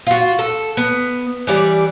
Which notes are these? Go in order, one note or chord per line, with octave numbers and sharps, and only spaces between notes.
F4 F#4
A4
B3
E3 G3 D5